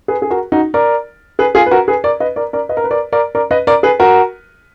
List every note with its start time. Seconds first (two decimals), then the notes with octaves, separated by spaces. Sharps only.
0.08 G#4 B4
0.22 G#4
0.30 F#4 A#4
0.52 D#4 F#4
0.74 A#4 D5
1.39 G#4 B4
1.55 F4 G#4
1.66 B4
1.71 F#4 A#4
1.88 G#4 B4
2.04 A#4 D5
2.20 B4 D#5
2.36 A#4 D5
2.53 A#4 D5
2.69 B4 D#5
2.77 A#4
2.84 B4
2.91 A#4 D5
3.13 A#4 D5
3.35 A#4 D5
3.51 B4 D#5
3.67 A#4 D5
3.83 G#4 B4
4.00 F#4 A#4